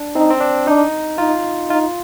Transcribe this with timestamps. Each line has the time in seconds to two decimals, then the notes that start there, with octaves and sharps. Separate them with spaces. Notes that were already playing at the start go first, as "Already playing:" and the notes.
Already playing: D4
0.15 C4 D#4
0.30 C4
0.41 D4
0.67 D4 D#4
1.18 D#4 F4
1.70 D#4 F4